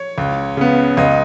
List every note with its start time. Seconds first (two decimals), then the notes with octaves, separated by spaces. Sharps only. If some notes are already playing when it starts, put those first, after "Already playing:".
Already playing: C#5
0.18 C#2
0.57 C#3 B3
0.97 C#2 D#5